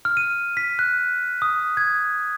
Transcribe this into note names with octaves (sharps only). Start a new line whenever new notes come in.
F6
D#7
B6
F#6
D#6
G#6